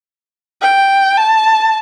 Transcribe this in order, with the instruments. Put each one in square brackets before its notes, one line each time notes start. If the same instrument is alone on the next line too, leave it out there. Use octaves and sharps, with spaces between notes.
[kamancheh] G5
A5